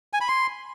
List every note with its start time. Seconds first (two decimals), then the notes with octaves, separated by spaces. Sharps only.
0.13 G#5
0.21 B5
0.28 C6